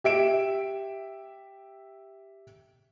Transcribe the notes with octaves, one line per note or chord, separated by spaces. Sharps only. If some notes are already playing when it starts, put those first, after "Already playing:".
G4 E5 D7 E7